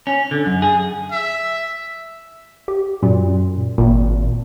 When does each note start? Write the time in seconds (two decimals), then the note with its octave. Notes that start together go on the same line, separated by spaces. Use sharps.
0.07 C#4
0.31 D3
0.46 F#2
0.62 G#4
1.11 E5
2.68 G4
3.03 F#2 A#2
3.78 G#1 A#2